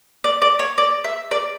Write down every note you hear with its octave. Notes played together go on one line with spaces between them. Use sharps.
D5
D5
C#5
D5
E5
D5